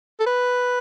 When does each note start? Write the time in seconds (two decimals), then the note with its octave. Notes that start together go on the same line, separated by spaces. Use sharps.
0.20 A4
0.27 B4